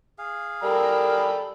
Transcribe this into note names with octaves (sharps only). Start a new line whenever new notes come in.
G#4 F5
G3 G4 A4 A#4 B5